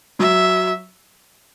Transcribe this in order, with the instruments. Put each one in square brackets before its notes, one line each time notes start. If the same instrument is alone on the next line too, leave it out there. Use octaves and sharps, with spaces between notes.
[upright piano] F#3 [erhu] E5